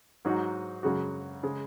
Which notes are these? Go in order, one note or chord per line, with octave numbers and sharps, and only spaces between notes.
G#2 F#3 D#4 F#4
F#2 C#3 G#3 F#4
C#3 G#3